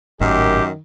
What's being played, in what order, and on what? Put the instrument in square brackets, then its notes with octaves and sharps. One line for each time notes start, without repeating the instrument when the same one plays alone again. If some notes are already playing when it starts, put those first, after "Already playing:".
[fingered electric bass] G#1 A2 [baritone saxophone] F#2 [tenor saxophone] D#3 [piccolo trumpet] G4